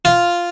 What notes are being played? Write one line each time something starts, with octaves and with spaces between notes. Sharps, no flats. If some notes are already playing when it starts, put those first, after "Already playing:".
F4